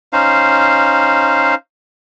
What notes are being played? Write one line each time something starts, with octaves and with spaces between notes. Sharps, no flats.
C#4 D#4 C5 F5